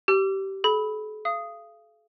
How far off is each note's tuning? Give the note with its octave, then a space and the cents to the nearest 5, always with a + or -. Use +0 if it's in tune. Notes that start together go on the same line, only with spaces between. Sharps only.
G4 -20 E6 +40
A4 -45 B5 +0
F5 -30 D#6 +0